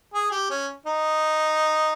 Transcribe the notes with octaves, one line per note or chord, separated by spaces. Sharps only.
G#4
G4
C#4
D#4